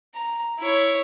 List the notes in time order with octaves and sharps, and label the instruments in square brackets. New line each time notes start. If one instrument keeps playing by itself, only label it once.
[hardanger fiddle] A#5
E4 C#5